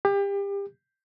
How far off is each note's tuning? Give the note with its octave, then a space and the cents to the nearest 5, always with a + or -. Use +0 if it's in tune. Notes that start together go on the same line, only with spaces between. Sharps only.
G4 +30